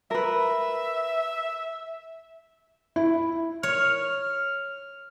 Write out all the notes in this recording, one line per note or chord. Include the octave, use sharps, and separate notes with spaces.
A#4 B4 E5
E4
C#5 F6